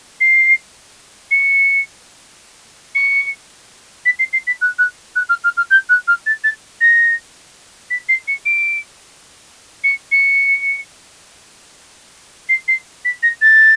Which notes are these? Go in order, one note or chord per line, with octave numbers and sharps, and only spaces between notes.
C7
C#7
C#7
B6
C7
C7
B6
F#6
F#6
F#6
F6
F6
F6
G6
F#6
F6
A6
A6
A#6
B6
C7
C#7
D7
C#7
C#7
C7
C7
B6
A#6
A6